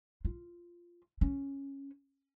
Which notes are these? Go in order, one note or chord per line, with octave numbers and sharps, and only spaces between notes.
F4
C#4